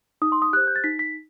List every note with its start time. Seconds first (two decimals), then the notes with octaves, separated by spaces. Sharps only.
0.22 D#4 D#6
0.32 C6
0.42 D#6
0.53 G4 C5 F#6
0.67 G6
0.76 A6
0.84 D#4 B6
0.99 B6